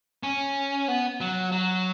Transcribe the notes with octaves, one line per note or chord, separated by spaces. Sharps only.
C#4
B3
F#3
F#3